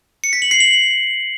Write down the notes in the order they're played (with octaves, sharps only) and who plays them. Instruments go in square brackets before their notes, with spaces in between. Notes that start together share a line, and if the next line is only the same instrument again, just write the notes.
[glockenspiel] C#7
B6
F#7
C7
F#7